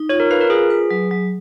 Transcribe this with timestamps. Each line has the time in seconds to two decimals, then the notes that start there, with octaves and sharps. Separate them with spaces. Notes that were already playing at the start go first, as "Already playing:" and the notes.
Already playing: D#4
0.09 F4 C#5
0.20 A#4
0.31 B4 F5
0.40 A#4
0.50 F4 G#4
0.70 B4
0.91 F#3
1.11 F#3